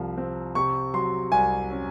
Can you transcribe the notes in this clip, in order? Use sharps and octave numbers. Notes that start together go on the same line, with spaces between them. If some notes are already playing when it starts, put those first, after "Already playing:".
Already playing: C2 C3 F3
C4
C3 C#6
F#3 C6
C2 G#5
C#4